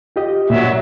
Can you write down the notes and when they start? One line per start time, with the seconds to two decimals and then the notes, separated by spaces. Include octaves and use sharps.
0.16 F4 G4 D#5
0.50 A#2 F#3 E5